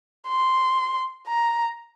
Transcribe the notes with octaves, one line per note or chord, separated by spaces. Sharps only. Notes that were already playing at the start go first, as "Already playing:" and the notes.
C6
A#5